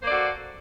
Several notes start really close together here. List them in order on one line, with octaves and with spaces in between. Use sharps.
C5 A#3 D5 A4 F#4